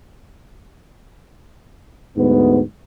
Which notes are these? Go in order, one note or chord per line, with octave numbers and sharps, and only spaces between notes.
D2 G#2 B3